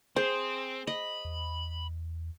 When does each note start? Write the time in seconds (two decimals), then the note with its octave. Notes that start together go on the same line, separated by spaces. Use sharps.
0.16 C4 G#4 C5
0.87 D#5 B5
1.25 E2